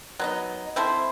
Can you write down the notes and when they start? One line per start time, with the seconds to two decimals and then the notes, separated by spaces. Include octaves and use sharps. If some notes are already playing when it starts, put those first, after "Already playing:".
0.19 F#3 B3 D#4
0.76 C4 E4 A4 C5